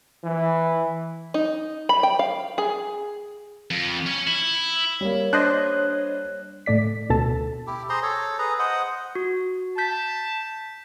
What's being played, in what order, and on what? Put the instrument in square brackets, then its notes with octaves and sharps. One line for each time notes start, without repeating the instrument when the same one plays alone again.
[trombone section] E3
[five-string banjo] D#4
B5
G5
F5
G#4
[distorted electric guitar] F2
C#5 G#5
E4
[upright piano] G3 A#3 [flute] C#5
[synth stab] D4 C5 D#5 [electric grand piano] F#6
[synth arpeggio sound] A2 A3 D5 B6
D2 B2 A4 A5
[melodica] E4 G4
G#4 C5 A#5 C6
A4 C#5
G#4 B4 A#5
C5 D#5 F#5
[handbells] F#4
[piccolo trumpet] A5 [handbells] G6 B6